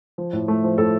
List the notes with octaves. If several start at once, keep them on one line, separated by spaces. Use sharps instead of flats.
F3
A2
A3
F3
A2 A4